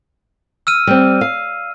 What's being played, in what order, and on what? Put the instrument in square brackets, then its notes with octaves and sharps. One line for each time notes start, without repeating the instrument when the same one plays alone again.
[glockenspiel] E6 F6 D#7
[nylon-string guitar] G3 C4
F5